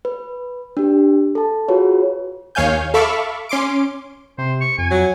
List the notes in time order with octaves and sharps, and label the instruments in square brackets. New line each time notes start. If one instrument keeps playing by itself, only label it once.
[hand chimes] B4
D4 G4
A4 A5
F4 F#4 G#4 B4 C#5
[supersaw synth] D#2 C#5 F5 G#5 G6
A4 E5 F5 B5 C#6 D6
C#4 C6 D6 D7
[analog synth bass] C3 [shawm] C5
[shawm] C#6
[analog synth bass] F2 [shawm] G#5
[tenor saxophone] F#3